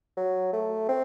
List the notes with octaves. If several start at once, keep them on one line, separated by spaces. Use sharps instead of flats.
F#3
A3
C4